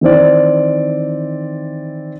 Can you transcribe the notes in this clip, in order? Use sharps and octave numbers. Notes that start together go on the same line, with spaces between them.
D#3 E3 C4 D5